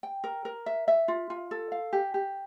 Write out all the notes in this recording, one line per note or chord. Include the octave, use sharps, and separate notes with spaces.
G5
A#4
A#4
E5
E5
F4
F4
A4
F5
G4
G4